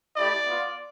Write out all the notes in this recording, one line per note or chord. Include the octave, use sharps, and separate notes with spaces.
A3 E4 G4 D5
B3 F4